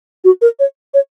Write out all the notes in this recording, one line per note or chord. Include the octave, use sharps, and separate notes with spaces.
F#4
A#4
C#5
C#5